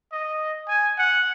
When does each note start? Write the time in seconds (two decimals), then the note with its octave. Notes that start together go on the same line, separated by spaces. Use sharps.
0.12 D#5
0.68 G#5
0.98 F#5